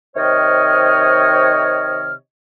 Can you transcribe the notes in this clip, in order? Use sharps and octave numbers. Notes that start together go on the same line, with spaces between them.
C3 D#3 C5 C#5 D#5 F6